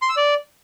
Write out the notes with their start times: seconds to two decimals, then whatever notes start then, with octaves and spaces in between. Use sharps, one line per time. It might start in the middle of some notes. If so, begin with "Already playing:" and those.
0.02 C6
0.09 E6
0.17 D5